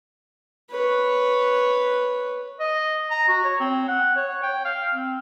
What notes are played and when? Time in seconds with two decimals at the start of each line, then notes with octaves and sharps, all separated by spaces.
0.70 B4 C#5
2.60 D#5
3.10 A#5
3.28 F#4
3.44 C#5
3.60 C4
3.88 F#5
4.16 C#5
4.43 G5
4.65 F5
4.94 C4